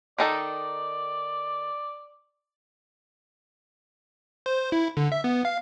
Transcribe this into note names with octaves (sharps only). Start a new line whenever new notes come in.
D#3 D#4 A4 D5
C5
E4
D3
E5
B3
F5